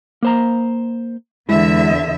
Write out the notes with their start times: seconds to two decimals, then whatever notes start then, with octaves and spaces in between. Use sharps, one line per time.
0.22 A#3 C5 A#5
1.49 E2 D3 G#3 E4 E5